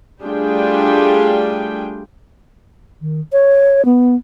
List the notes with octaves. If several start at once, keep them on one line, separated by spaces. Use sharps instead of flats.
G3 A3 D4 F4 G#4 G5
D#3
C#5
B3